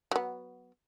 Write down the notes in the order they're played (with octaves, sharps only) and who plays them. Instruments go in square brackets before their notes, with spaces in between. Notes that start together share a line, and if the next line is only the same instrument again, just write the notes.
[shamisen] F#3 B3